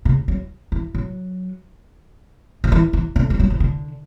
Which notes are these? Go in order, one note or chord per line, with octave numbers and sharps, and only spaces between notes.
C#3
F#3
E3
F#3
F#3
E3
E3
D3
G3
F#3
E3
D3